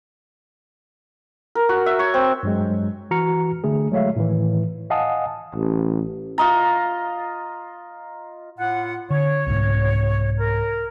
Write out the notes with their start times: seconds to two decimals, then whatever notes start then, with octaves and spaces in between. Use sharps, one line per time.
1.55 A#4
1.69 F#4
1.86 E5
1.99 C#5
2.14 C4
2.43 G2 F#3 G#3
3.11 E3 F#4 A#5 F6 C#7
3.64 D3 A3 G#4
3.91 F#3 G#3 A3 C#5 E5 F5
4.16 A2 D#3 E3
4.90 D#5 F5 F#5 G#5 A5 D#6
5.55 A1
6.38 F4 D#5 A#5
8.59 A2 F4 F#5
9.10 D3 C#5
9.46 C2 G#2
10.39 A#4